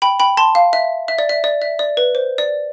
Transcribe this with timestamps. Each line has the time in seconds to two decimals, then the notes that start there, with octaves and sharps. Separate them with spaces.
0.02 G5 B5
0.20 G5 B5
0.37 A5 C6
0.55 F5
0.73 E5
1.08 E5
1.18 D5
1.29 E5
1.44 D5
1.62 E5
1.79 D5
1.97 B4
2.15 C5
2.38 D5